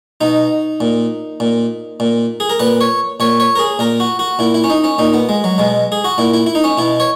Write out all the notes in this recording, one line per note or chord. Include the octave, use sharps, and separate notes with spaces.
B2 D#4
A#2
A#2
A#2
G#4
A#4
A#2 B4
C#5
A#2 C#5
C#5
A#4
G#4
A#2 A#4
F#4
F#4
A#2 E4
E4
C#4
D#4
C#4
A#2 D#4
B3
G#3
F#3
B2 G#3
G#4
F#4
A#2 E4
E4
E4
D#4
C#4
B2 E4
C#5